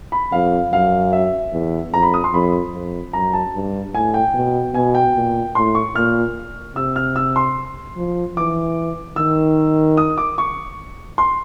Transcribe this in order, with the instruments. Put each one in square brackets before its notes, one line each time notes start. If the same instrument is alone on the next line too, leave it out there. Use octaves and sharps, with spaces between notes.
[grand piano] B5
[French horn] F2 [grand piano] F5
[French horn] F#2 [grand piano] F5
[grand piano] E5
[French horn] E2
[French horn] F2 [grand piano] A#5
[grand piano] B5
D#6
C6
[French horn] F2 [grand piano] B5
[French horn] F2
[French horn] F#2 [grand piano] A#5
[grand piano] A5
[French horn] G2
[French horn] A2 [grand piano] G#5
[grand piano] G5
[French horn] B2
[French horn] B2 [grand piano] G#5
[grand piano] G5
[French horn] A#2
[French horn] A2 [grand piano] C6
[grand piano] C#6
[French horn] A#2 [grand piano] F6
[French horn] C3 [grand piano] E6
[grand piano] F6
E6
C6
[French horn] F3
[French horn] E3 [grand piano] D6
[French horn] D#3 [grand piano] E6
[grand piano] D#6
D6
C#6
C6